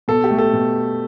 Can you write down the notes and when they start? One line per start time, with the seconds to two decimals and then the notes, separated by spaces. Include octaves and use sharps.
0.08 B2 A4
0.24 G4
0.31 A3
0.38 A4
0.53 B2